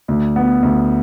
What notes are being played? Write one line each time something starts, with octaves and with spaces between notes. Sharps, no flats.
D2
B3
D2